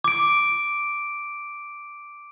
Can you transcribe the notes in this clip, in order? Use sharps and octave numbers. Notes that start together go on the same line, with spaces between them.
D6 D7